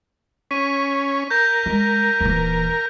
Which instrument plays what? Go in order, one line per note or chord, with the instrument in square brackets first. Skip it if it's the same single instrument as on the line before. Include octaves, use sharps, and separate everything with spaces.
[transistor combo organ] C#4 [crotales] B6 D#7
[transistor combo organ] A#4 [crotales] G6 A#6
[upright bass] G#3
D#1 E3